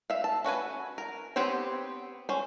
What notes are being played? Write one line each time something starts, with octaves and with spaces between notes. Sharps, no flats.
E5 F5
A5
C#4 F#4 B4 G#5
A#4
B3 C4 G4 C5 C#5
C#4 C5